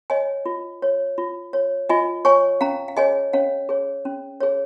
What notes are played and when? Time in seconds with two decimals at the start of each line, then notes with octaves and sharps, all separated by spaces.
0.10 C#5 D#5 G#5
0.46 F4
0.82 C#5
1.18 F4
1.53 C#5
1.89 F4 D#5 G#5
2.25 C#5 G#5 C#6
2.61 C#4 F5 A#5
2.88 F5
2.97 G#4 C#5 D#5 G#5
3.33 C#4 C#5 F5
3.69 G#4 C#5
4.05 C#4
4.41 G#4 C#5